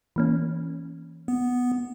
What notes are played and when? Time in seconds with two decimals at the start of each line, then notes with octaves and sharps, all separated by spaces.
0.16 E3 A#3 C#4
1.28 B3